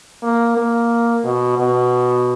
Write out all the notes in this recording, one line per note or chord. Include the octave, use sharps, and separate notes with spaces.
A#3
A#3
B2
B2